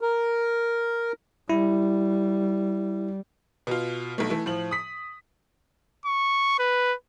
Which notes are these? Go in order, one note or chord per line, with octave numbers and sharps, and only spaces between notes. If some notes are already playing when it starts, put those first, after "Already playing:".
A#4
G3 E4
B2 F4
B1 A3
E3 A3
A2 F3 F#7
D#6 B6
C#6
B4